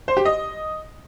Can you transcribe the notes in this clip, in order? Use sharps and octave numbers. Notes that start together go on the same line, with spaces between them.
C5
G4
D#5